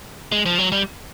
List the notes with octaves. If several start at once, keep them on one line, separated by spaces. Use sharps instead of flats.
G#3
F3
F#3
G3